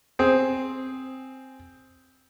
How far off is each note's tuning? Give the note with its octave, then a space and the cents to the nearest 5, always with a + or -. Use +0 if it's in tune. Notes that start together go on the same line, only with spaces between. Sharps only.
C4 +0 G#4 +0